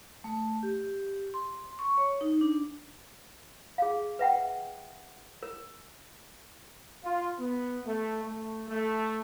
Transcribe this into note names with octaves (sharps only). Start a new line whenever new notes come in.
A3
G4
C6
C#6
C#5
D#4
D4
G#4 F5
B4 E5 F#5 G5
A#4
F4
B3
A3
A3
A3